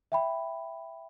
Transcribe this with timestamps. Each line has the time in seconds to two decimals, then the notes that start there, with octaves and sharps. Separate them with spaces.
0.12 E5 G5 B5